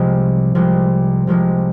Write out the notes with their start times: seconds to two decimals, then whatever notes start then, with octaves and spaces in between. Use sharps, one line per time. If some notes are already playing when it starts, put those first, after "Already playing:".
Already playing: C2 C3 F3 G#3
0.55 C2 C3 F3 G#3
1.27 C2 C3 F3 G#3